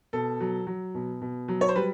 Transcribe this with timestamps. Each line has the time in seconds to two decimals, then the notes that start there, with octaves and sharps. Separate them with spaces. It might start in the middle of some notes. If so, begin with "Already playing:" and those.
0.13 B2 A4
0.40 F#3
0.67 F#3
0.94 B2
1.21 B2
1.48 F#3
1.61 C#5
1.69 C5
1.76 G3 B4